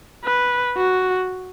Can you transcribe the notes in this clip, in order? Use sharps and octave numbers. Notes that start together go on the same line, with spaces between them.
B4
F#4